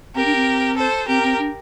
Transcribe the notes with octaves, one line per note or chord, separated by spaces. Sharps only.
C4 G4 A#4
D4
C4
A4 C5
C4 G4 A#4
C4
D4